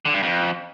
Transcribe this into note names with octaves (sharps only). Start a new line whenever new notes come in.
D3
G2
F2